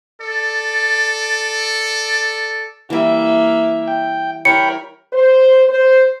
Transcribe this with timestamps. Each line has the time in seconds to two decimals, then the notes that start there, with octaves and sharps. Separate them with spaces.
0.20 A4 D5
2.90 E3 G3 A#3 E5
3.88 G5
4.45 G3 E4 A#4 C#5 G5 B5 C#7
5.13 C5
5.69 C5